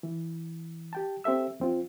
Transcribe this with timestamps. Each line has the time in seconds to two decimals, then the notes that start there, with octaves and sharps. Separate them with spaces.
0.03 E3
0.93 G4 G5 A5
1.24 C4 G4 A4 E5 E6
1.60 F2 C4 F4